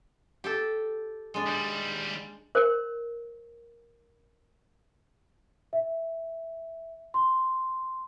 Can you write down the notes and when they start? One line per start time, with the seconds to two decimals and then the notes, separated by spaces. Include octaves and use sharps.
0.44 G4 A4
1.34 G#3 D4
1.46 D#2 G3
2.55 A#4 C5
5.73 E5
7.14 C6